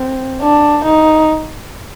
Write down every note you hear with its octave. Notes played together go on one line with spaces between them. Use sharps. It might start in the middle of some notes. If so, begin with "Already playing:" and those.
Already playing: C4
D4
D#4